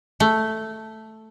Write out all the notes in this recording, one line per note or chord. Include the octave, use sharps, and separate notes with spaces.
A3